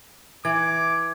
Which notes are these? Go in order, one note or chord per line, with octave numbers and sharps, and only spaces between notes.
E3 D6 G#6